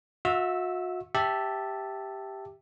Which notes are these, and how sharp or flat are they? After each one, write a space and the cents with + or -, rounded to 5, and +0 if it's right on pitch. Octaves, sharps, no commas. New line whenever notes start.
F#4 -40 E5 -20 E6 +0
G4 +0 E5 +0 A5 +0